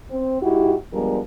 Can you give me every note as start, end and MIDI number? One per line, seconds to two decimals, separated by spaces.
0.11 0.39 60
0.42 0.74 44
0.42 0.74 64
0.42 0.74 66
0.42 0.74 67
0.93 1.19 53
0.93 1.19 55
0.93 1.19 56
0.93 1.19 59
0.93 1.19 62
0.93 1.19 70